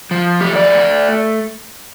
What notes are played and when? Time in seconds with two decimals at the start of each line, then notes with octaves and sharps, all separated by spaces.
0.11 F3
0.41 A3 G4
0.56 D5
0.70 A3